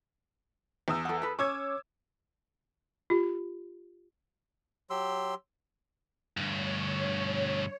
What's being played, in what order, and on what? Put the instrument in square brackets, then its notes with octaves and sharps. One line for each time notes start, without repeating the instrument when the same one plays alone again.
[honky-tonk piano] E2 D#6 E6
[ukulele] A4 F#5
A4 B4
[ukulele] C#4 C#5 [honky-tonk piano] D6 E6 G#6
[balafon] F4 G4
[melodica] F#3 G4 C6 E6
[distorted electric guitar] D2 G2 [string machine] C#5